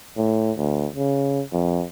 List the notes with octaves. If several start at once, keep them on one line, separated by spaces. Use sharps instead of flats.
A2
D2
C#3
F2